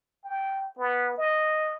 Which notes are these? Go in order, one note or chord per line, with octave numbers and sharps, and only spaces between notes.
G5
B3
D#5